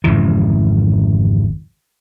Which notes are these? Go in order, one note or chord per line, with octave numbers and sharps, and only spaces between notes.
G#1 F2 C#3 E3